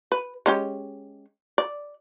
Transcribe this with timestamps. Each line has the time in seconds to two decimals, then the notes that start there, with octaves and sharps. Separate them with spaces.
0.12 B4
0.46 G#3 C#4 G4
1.58 D5